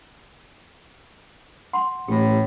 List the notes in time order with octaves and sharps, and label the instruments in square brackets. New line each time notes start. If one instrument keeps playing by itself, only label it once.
[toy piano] F#5 C6
[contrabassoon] A1 [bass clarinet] A2 [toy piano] G4